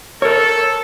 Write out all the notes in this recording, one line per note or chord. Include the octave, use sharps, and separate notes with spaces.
A4 A#4 C#5